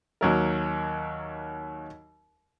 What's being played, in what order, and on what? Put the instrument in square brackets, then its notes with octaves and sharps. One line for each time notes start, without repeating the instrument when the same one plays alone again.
[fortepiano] D#2 F#3 A#4